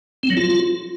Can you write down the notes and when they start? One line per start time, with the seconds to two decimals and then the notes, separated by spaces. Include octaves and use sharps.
0.23 C4
0.30 F#3
0.37 F4